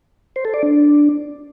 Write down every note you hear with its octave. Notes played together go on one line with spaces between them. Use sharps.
C5
A4
D5
D4